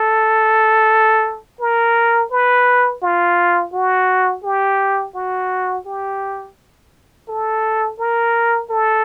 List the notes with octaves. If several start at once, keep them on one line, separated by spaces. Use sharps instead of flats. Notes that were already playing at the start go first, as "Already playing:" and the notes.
Already playing: A4
A#4
B4
F4
F#4
G4
F#4
G4
A4
A#4
A4